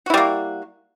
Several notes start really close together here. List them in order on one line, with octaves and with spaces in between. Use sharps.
F#4 E4 G3 A#3